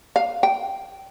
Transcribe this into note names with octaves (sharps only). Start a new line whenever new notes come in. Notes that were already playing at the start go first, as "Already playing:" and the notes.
F5
G5